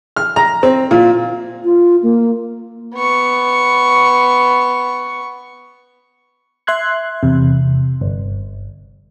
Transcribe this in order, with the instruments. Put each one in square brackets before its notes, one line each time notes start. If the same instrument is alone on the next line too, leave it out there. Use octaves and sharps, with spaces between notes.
[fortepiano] F6
A#5
C4
A#2
[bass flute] F4
A#3
[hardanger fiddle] B3 C#6
[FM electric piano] E5 C6 F#6 G#6
E2 C3
G1